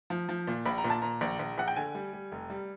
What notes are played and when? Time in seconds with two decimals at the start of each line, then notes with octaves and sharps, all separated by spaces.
0.10 F3
0.29 F3
0.47 A#2
0.66 A#1 B5
0.78 A#5
0.84 A#2
0.90 A5
1.02 A#2 A#5
1.21 A#1
1.39 A#1
1.58 A#1 F#5
1.68 G5
1.76 D3 G#5
1.95 G3
2.13 G3
2.32 F1
2.50 G3